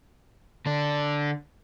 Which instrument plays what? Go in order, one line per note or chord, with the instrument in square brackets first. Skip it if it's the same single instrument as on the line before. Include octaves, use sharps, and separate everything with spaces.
[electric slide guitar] D3 D4